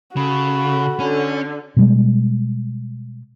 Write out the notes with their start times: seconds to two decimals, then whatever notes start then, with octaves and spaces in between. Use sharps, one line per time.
0.16 C#3 F#4 A4 B5
1.00 D3 C#4
1.76 B2 G3 G#3